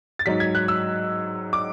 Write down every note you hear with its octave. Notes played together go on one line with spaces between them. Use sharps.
A6
G#2 F#3 B6
G#6
F#6
E6
D6